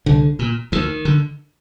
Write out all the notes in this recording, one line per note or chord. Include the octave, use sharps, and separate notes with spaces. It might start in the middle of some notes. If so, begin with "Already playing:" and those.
C2 D3
A#2
D2 D#3
D3